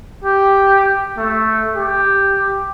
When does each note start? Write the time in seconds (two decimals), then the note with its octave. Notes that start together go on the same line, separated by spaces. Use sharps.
0.24 G4
1.18 A3
1.76 G4